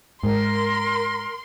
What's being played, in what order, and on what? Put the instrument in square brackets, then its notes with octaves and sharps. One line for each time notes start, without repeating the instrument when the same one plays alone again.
[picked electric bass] G#2 [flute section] A#4 [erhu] C6